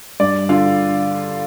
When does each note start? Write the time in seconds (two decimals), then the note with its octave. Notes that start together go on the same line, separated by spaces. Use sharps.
0.20 G2 D5
0.49 D3 F4 F5